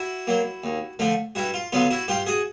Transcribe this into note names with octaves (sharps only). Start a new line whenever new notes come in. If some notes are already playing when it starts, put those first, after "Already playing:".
Already playing: E4 F#4
F#3 A#3
D#2
D3 F3 A3
G2 E4 F#4
F4
D3 F#3 B3 F4
E4 F#4
G2 F4 G4
F#4 G#4